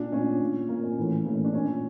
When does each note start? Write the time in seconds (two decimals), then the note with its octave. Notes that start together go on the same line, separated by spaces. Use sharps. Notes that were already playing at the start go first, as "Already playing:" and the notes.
Already playing: A#2 D4
0.12 A#2 C#4
0.41 A#2
0.68 A#2 A#3
0.83 C#4
0.97 A2 E3
1.25 A2 E3 A#3
1.35 C#4
1.45 D4
1.54 A#2 C#4